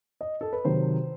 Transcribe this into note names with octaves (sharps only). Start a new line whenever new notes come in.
D#5
A4
B4
C3 D#3 F#3 C5